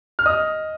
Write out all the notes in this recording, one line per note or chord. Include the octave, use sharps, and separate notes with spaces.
F6
D#5 D#6